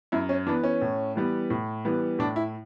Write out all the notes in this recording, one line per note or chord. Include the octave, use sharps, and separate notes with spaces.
F#2 E4
C#4
E3 B3 D4
C#4
A2
E3 G3 B3
A2
E3 G3 B3
A2 D4
E4